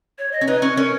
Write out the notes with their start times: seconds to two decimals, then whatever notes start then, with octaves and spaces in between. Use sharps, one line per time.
0.19 C#5
0.32 D#5
0.41 C#4
0.47 D#4 B4
0.62 C#4
0.76 C#4 A#4